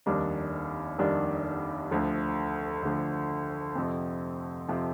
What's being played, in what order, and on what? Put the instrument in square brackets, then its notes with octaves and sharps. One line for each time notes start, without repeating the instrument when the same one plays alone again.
[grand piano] F1 D#2 D#3 G3 D4
F1 D#2 D#3 G3 D4
D2 D3 F3
D2 D3 F3
F2 C3 F3 C4
F2 C3 F3 C4